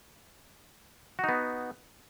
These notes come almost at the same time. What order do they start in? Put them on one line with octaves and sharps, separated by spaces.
F#4 D#4 B3